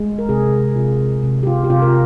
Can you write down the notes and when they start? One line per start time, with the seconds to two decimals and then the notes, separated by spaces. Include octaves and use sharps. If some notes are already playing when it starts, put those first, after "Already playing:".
Already playing: G#3
0.19 A#4
0.29 C3 G#4
0.76 C3 F4
1.23 C3
1.43 G4
1.47 F4
1.64 G4
1.70 C3 F4
1.82 A#4